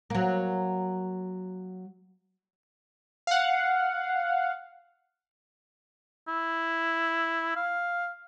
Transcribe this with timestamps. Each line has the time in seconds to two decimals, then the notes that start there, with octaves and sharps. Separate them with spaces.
0.10 F#3 A#3
3.27 F5 F#5
6.28 E4
7.56 F5